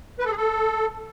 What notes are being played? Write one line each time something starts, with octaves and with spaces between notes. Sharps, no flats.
B4
A4
G#4
A4